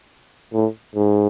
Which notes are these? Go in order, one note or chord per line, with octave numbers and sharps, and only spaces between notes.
A2
G#2